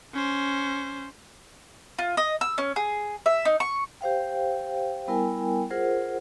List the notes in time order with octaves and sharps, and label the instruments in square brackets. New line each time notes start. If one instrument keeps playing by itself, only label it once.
[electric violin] C#4 C5
[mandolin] F4
D#5
E6
C#4
G#4
E5
D#4
C#6
[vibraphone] G4 C5 F5 G5
G3 B3 E4 A#4 G5 G#5
F4 G#4 A#4 C5 F#5